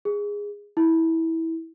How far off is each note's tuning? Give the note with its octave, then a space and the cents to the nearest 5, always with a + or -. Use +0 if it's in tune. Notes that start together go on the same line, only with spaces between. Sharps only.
G#4 -15
E4 -20